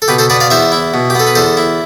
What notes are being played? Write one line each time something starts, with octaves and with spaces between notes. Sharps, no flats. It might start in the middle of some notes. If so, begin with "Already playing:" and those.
A4
B2 G4 B4
A4 C5
B3 B4 D5
D5 F5
E2 C5 E5
E4
B2
G4
B3 A4
B4
E2 A4 C5
E4